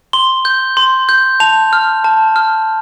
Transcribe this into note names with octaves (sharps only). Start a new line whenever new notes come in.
C6 G7
G6
C6
G6
A5 F7
F6
A5
F6